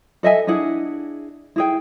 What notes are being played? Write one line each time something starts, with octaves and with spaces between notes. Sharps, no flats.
A4 D#5 E5 G#5
D4 E4 G#4 F#5
E4 G#4 G5